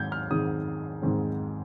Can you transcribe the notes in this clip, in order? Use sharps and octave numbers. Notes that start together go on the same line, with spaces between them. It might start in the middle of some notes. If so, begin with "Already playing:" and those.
Already playing: G#2 D#3 G#3 C4 G6 G#6
F6
G#2 D#3 G#3 C4 D#6
G#2 D#3 G#3 C4